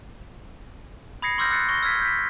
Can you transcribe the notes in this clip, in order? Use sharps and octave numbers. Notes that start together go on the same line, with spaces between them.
B5 D#6 G#6 A#6 C7 C#7
C6 D6 E6 F6 G6 A#6
E6 F#6 G6 A6 C7 C#7
C#6 A#6 G7
E6 F6 G#6 B6
G6 B6